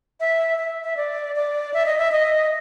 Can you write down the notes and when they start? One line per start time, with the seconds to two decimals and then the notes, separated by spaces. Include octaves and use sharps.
0.20 E5
0.59 E5
0.84 E5
0.97 D5
1.36 D5
1.74 E5
1.86 D#5
1.98 E5
2.12 D#5